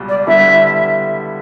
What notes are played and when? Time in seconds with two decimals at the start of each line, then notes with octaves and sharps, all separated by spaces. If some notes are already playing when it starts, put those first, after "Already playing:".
Already playing: C#2 B2 G3
0.08 D5
0.27 D3 G3 B3 E4 A4 E5